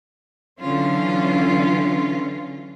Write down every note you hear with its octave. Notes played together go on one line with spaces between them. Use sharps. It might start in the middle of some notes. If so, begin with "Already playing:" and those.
D3 E3 F#3 C#4 F4